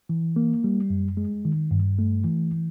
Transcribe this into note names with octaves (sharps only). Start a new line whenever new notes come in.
E3
A#3
G3
F#2
G#3
D#3
G2
A3
E3